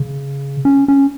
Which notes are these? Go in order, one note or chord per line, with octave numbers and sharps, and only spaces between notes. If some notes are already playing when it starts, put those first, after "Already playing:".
Already playing: C#3
C#4
C#4